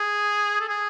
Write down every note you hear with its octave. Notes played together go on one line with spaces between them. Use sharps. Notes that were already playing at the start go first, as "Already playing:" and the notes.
Already playing: G#4
A4
G#4